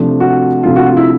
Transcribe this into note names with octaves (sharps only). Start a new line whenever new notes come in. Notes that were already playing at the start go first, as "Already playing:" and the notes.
Already playing: C3 F3 A3 D4
F#4
C3 F3 A3 D4 F4
F#4
F4
E4